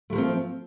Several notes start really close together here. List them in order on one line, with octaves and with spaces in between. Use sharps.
A3 G#3 F3 C4